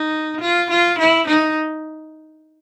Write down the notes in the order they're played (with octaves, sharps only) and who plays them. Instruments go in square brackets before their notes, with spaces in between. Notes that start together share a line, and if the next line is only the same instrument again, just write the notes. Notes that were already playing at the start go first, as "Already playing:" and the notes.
Already playing: [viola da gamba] D#4
F4
F4
E4
D#4